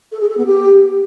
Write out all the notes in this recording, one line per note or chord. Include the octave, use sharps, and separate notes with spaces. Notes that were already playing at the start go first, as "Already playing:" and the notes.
A4
G#4
A4
B3
G4